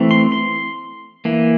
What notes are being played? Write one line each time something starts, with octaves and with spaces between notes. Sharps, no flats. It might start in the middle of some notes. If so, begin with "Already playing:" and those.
Already playing: E3 A3 C4
C6
C6
E3 A#3